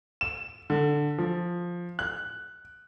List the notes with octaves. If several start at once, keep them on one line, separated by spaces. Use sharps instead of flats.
E7
D3
F3
F#6